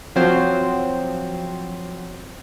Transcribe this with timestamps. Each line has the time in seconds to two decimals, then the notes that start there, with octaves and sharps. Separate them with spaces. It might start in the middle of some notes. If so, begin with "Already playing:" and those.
0.16 F3 F#3 C4 C5